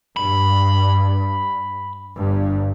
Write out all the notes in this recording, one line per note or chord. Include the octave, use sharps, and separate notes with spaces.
G2 B5
G1 G2